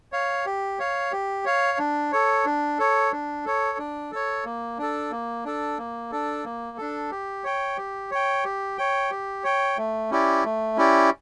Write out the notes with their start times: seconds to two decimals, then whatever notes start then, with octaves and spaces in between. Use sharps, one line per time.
0.12 C#5 F5
0.46 G4
0.79 C#5 F5
1.12 G4
1.45 C#5 F5
1.78 D4
2.12 A4 C#5
2.45 D4
2.79 A4 C#5
3.12 D4
3.45 A4 C#5
3.78 D4
4.11 A4 C#5
4.45 A#3
4.78 D4 A4
5.11 A#3
5.45 D4 A4
5.78 A#3
6.12 D4 A4
6.44 A#3
6.78 D4 A4
7.11 G4
7.44 C#5 G5
7.77 G4
8.11 C#5 G5
8.44 G4
8.78 C#5 G5
9.10 G4
9.44 C#5 G5
9.77 A3
10.10 C#4 E4 G4 D5
10.44 A3
10.77 C#4 E4 G4 D5